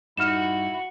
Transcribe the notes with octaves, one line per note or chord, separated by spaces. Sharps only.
G2 D#4 E4 F#4 F6 E7